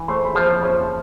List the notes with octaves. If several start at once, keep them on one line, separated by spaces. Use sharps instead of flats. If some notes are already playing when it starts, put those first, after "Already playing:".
Already playing: E3
A3 C5 C6
B5
F3 C5 C6
C#4 C5 C6